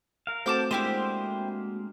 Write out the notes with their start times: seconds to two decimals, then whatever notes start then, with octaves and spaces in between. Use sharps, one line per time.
0.27 A#4 F5
0.46 A3 C4 F#4 A5 D6 G6
0.71 G#3 A#3 D4 E4 G4 C5